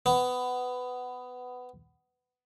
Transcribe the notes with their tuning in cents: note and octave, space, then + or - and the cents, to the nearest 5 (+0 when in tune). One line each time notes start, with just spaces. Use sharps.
B3 +15